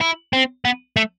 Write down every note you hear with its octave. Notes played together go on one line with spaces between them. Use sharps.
E4
C4
B3
A3